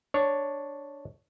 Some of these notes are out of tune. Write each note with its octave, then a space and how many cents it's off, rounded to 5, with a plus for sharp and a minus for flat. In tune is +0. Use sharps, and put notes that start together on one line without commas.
D4 +0 C#5 +0